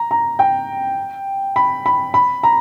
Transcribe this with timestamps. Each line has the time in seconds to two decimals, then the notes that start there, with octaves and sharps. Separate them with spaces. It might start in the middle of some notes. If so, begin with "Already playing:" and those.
Already playing: A#5
0.11 A#5
0.39 G5
1.56 B5
1.86 B5
2.14 B5
2.43 A#5